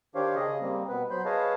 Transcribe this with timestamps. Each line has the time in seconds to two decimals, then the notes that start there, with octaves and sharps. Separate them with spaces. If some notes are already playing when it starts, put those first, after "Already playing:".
0.15 D#3 D4 G4 C5 C#5 F5
0.35 C#3 G#4 D#5
0.61 G3 A#3 C4
0.89 B2 B3 B4
1.11 F#3 C5 B5 C6 G6
1.25 G#4 B4 C#5 D#5 F5 A5